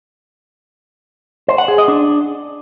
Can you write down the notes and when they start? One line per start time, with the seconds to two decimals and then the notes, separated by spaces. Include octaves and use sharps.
1.48 C5
1.58 F#5
1.68 G#4
1.78 D#5
1.88 D4